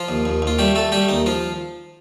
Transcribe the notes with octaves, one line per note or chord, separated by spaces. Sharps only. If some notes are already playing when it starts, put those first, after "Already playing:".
Already playing: F3 F4
D#2
D#2
D#2 F4
G3 A3 G4
A3 A4
G3 A3 G4
D#2 D#4
F3 F4